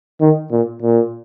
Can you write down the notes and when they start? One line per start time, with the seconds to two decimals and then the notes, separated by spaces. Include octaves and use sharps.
0.21 D#3
0.51 A#2
0.82 A#2